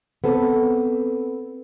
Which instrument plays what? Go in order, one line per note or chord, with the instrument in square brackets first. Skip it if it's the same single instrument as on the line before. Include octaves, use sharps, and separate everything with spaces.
[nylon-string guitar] B3 C4 A4